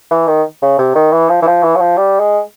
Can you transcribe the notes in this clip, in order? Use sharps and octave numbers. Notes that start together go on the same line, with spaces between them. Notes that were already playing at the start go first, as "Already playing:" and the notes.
E3
D#3
C#3
C3
D#3
E3
F3
E3
F3
E3
F#3
F3
G3
G#3